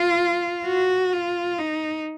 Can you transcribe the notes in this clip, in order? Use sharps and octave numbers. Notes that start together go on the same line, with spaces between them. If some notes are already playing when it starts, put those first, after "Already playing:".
Already playing: F4
F#4
F4
D#4